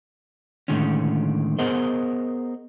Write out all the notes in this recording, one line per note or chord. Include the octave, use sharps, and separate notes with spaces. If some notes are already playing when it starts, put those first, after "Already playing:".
A2 D3 D#3 G#3 C#4
B3 G#4 A#4 C5 D#5